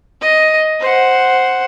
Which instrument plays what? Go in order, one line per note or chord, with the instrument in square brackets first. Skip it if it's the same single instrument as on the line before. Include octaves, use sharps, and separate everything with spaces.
[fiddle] D#5
C5 F#5